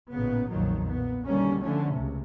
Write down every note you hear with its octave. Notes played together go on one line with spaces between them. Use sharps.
A1 A#2 C#3 B3
B1 F2 A#2 D#3 F#3
A#2 B3
B2 D3 D#3 G3 A#3 C#4
D3 F3 A3 C#4
C#2 C3